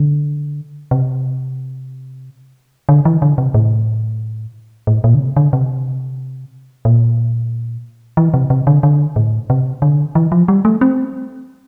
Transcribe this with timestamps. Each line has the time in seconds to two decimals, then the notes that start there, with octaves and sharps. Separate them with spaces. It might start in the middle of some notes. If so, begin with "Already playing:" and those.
Already playing: D3
0.91 C3
2.89 D3
3.05 E3
3.22 D3
3.38 C3
3.54 A2
4.87 A2
5.04 A#2
5.15 D3
5.20 C3
5.37 D3
5.53 C3
6.85 A#2
8.17 E3
8.34 C3
8.50 C3
8.67 D3
8.83 D3
9.16 A2
9.50 C3
9.82 D3
10.15 E3
10.32 F3
10.48 G3
10.65 A3
10.81 C4